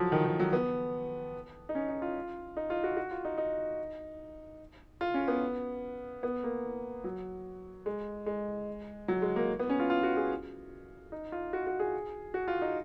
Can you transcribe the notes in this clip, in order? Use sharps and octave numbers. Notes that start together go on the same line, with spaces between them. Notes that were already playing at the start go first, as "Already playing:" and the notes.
Already playing: F3 F#3
D#3
D#3
F#3
B3
D#4
C#4
D#4
F4
D#4
F4
F#4
F#4
F4
D#4
D#4
F4
C#4
B3
B3
A#3
F#3
G#3
G#3
F#3
G#3
A#3
B3
C#4
F4
F4
F#4
G#4
D#4
F4
F#4
F#4
G#4
F#4
F4
D#4